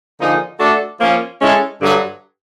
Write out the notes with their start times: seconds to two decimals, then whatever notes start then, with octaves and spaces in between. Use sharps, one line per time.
0.19 D3 F3 A#3 D#4 G#4
0.59 A3 D4 F#4 A4
0.99 F3 A#3 C#4
1.40 G#3 C#4 E4 A4
1.80 G2 D3 F#3